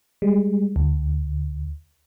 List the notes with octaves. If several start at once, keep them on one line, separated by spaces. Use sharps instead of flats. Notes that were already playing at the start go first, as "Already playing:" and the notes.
G3 G#3
D2